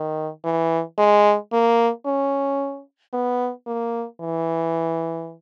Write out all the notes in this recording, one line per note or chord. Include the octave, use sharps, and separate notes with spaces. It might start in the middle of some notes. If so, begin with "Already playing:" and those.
Already playing: D#3
E3
G#3
A#3
C#4
B3
A#3
E3